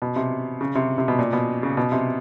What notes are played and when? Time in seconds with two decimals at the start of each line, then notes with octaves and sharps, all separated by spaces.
0.02 B2
0.16 C3
0.61 C#3
0.75 C3
0.98 C3
1.08 B2
1.19 A#2
1.33 B2
1.63 C#3
1.77 B2
1.92 C3